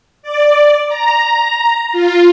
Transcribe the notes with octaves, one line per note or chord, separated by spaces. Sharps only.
D5
A#5
F4